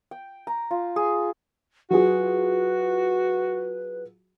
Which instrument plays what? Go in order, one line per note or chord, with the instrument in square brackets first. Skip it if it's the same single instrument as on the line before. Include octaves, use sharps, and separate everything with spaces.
[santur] G5
A#5
F4
G#4
[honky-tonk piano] F#3 F4 G#4 [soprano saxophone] F#4 [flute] B4